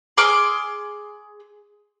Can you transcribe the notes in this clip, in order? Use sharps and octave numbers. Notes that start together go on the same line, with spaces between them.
G#4 C6 D6 F6